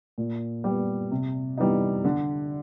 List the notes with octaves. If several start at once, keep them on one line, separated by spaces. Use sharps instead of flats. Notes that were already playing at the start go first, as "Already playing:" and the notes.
A#2
G3 B3
C3
E3 G3 B3 D#4
D3